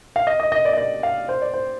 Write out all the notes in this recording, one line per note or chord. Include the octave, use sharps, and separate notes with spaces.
F5
D#5
D#5
D#5
D5
D#5
D5
F5
C5
D5
C5